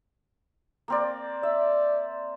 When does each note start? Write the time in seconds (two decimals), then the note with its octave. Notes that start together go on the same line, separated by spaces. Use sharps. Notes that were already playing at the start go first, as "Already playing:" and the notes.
0.88 A#3 C4 D5
1.43 D5 E5